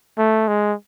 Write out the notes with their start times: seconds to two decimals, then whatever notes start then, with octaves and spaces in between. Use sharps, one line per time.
0.18 A3
0.48 G#3